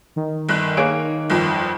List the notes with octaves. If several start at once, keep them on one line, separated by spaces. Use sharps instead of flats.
D#3
G1 F#6
A#3 G#4 C#5 D7
G1 F2